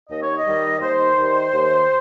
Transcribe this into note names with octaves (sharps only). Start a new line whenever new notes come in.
D#2 D#5
C#5
D#5
D#3 G3
D#2 C5
D#3 G3
D#2